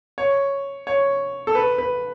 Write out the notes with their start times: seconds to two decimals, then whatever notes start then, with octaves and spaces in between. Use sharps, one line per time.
0.18 C#5
0.87 C#5
1.47 A4
1.55 B4
1.78 B4